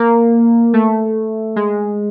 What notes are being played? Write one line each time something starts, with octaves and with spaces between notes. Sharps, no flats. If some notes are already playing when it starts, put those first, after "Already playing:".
Already playing: A#3
A3
G#3